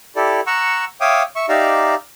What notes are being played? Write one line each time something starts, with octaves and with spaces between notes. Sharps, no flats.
E4 G4 A4 D5
F#5 A#5 C#6 E6
C#5 E5 F5 G5 D6 D#6
E5 C#6
D#4 G4 D5 E5 F5 A#5